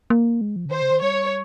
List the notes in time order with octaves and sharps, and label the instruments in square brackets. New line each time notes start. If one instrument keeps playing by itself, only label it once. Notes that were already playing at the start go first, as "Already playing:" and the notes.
[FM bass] A#3
G#3
F3
C#3
[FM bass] D#3 [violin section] C5
[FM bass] C#3
D#3
[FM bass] G3 [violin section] C#5